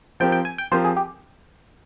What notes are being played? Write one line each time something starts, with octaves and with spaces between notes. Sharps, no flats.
F3 C4 G4 A#4 G5
G5
G#5
G5
F3 C4 G4 A#4 C5
G#4
G4